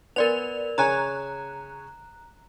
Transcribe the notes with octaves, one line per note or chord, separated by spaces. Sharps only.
B3 A#4 D5 F7
C#3 C#5 G#5 A#5 F#6